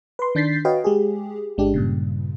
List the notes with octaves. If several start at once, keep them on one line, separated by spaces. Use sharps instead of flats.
B4 C6
D#3 D4 G6 A6 B6 C7
F#4 B4 C#5 D#5 F5 G5
G#3 G4 G#4
G1 G#3 D4 G4
G2 A#2 C#3